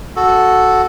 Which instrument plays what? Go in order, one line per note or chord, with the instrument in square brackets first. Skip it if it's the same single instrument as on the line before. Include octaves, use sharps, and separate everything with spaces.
[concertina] F#4 A4